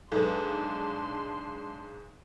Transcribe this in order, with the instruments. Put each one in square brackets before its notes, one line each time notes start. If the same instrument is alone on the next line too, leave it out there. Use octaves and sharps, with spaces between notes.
[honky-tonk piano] B1 G#2 [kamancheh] D4 C6 [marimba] A4 B4